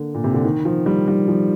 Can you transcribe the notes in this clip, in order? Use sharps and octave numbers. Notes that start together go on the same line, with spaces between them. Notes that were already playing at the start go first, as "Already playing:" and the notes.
Already playing: D3 A#3
A#2
C3
D3
D#3
F3
G3
G3
F3